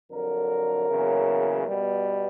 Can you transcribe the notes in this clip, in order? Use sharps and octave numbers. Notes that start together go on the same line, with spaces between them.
F2 D3 F#3 A#4
E2 C#3 F#3 A#3
B2 G3 B3